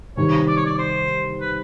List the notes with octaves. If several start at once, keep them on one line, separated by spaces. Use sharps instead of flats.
C3 D#3 G3 C#5
D5
C#5
D5
C5
B4